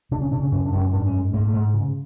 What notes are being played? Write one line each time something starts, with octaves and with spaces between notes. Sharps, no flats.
C#3 D4
C#4
C#3 D4
C#4
F#2 C#4
D4
F#2
C#4
G#2 D4
C#4
G#2
G#2 A#3
A3
G#2
C#3